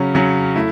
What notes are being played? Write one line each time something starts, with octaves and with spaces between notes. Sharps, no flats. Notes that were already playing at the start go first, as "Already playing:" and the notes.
Already playing: C#3 F#3 C#4
C#3 F#3 C#4
A3 E4